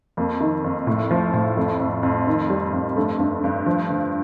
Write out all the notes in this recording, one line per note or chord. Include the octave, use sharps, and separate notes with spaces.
F2 A#3
D#3
F2
A2
F3
A2
F2 A3
F2
F2
D#3
G3
F2
G2 A3
G2
G2
F3
D3